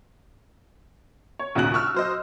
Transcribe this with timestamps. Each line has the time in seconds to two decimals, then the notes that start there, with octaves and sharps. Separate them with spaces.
1.39 C#5
1.55 A#1 D#2 C#3 F#4 F#6 F#7
1.74 C#6 E6 F6
1.94 F#3 C5 D#5